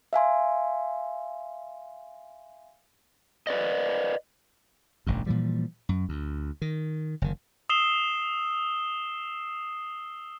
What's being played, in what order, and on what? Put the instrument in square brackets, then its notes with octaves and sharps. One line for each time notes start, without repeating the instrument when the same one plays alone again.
[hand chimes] E5 F5 G#5 C6
[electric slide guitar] B4 D5 D#5
[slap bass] E1 A1 G2
A#2 E3 F3 G3
F#2
D2
D#3
F#1 D#3
[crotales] D#6 E6 C7 E7 G7